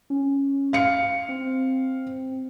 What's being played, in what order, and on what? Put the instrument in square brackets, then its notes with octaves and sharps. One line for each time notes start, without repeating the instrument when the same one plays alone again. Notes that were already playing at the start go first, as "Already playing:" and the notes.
[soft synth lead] C#4
[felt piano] F5 C#7
[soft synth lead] C4